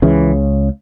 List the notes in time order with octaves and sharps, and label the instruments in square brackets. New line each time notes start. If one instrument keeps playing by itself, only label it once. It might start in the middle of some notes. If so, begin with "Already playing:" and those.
[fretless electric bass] C#2 C#3 E3